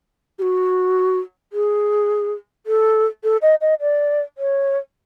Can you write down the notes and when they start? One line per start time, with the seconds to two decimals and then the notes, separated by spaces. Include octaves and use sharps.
0.39 G4
0.42 F#4
1.53 G#4
2.66 A4
3.24 A4
3.42 D#5
3.61 D#5
3.81 D5
4.38 C#5